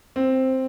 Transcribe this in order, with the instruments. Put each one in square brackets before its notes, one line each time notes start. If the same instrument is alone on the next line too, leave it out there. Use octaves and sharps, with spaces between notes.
[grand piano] C4